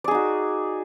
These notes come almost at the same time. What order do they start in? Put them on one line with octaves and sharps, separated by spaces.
D5 G#4 D#4 F#4